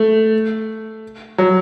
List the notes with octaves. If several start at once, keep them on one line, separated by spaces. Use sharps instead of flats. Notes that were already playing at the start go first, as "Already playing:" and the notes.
Already playing: A3
F#3